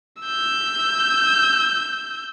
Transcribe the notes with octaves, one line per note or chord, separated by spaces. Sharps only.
E6 G6